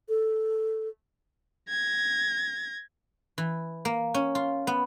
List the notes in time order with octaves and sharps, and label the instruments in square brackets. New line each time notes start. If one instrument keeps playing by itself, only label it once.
[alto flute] A4
[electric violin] G#6 A#6
[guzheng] E3
A#3
C#4
F4
B3